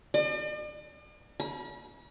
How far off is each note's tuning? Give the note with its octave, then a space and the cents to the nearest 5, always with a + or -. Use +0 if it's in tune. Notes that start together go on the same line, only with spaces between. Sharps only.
D5 +45
B5 -45